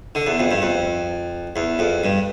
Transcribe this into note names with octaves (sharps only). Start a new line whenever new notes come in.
D3
E2
F2
G2
F2
E2
F2
G2